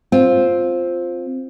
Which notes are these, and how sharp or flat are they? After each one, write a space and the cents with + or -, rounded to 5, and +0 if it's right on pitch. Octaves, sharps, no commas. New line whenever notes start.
C4 +5 F4 +5